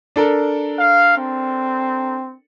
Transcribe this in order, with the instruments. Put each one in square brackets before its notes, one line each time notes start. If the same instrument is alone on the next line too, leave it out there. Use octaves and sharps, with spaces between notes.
[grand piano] D4 A4 A#4
[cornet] F5
C4